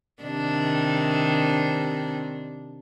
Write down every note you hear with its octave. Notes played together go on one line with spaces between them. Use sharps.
C3 D#3 D4